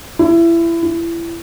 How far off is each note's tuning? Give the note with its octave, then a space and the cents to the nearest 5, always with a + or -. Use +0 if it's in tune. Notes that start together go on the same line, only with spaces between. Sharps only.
E4 +25
E4 +30